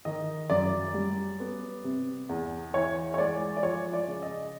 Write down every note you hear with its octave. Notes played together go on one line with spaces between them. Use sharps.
D#3 D#5
F#2 D5
G3
B3
C3
E2
E3 C#5
C#5
G#3 D5
D5
F3 C#5
D5
C#3
D#5